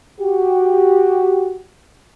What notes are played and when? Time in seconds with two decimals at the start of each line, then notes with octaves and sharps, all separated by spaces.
0.20 F#4 G4